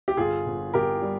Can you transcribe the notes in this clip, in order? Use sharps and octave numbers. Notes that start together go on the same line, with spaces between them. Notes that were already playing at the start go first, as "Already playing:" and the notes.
G4
G1 F4 G#4
G1
G1 G4 A#4
G3